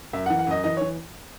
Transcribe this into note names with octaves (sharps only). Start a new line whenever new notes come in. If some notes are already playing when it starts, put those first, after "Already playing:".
F#2 E5
E3 F#5
F#5
F#2 D#5
E3 D#5
C#5
E3